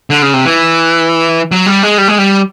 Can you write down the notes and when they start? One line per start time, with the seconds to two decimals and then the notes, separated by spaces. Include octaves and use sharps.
0.10 D3
0.22 C#3
0.33 C3
0.45 E3
1.51 F#3
1.66 G3
1.83 G#3
1.98 G3
2.08 G#3
2.18 G3